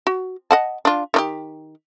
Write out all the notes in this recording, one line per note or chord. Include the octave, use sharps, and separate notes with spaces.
F#4
D#5 F#5 A5
D4 F4
D#3 D4 G4